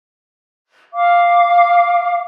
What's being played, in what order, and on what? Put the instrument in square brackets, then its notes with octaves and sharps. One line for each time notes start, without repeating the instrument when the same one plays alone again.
[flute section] F5 D6